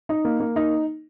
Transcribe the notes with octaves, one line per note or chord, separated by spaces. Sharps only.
D#4
A#3
A#3
D#4